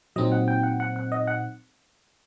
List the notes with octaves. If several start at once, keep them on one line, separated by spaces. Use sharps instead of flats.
A#2 F#3 C4 D#4 D#5
F#5
G5
F#5
F#5
F#5
D#5
F#5